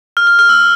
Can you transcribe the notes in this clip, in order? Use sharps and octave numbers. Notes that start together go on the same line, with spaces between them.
F6
F6
F6
E6